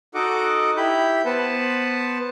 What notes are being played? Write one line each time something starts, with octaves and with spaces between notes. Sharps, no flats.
D#4 F#4 A4 D#5 F#5 D6
E4 G4 B5 G6
B3 B4 C5 F#5 A5